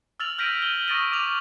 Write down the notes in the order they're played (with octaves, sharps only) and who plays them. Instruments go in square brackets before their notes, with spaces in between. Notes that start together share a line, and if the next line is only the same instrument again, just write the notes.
[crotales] E6 F6 A6 F7 F#7
F6 G6 A#6 B6 D7 D#7
D#7 F#7 G7
C#6 D#6 A6 A#6 D7 D#7
D6 F6 F7 F#7